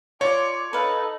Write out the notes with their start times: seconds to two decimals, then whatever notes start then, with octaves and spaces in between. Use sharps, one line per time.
0.21 F4 A#4 C#5 D5
0.73 D#4 A4 B4 F5